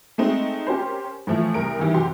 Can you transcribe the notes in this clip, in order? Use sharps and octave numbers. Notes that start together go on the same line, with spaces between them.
G#3 A3 C4 D#4
C#4 G4 A#4 C5
A2 E3 F3 A3
C2 A#4 D7
D#3 E3 G3
F1 F#2 F#4 G4 C6